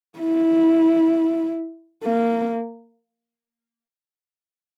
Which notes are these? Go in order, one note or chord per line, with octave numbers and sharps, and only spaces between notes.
E4
A#3